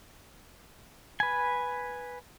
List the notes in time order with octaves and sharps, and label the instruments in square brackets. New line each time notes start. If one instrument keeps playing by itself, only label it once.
[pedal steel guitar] B4 G#5